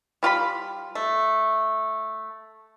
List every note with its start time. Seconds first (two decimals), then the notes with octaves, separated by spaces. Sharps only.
0.23 G3 F4 A4 B5
0.95 A3